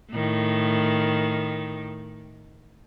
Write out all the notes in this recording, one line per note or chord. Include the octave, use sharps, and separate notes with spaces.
A2 D#3